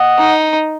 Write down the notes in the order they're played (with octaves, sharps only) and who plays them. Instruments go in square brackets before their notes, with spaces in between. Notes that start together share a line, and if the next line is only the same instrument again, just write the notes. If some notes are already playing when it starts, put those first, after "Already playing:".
Already playing: [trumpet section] D#5 F#5
[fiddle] D#4